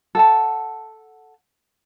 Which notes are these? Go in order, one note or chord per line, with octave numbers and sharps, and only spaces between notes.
A4 F#5 A5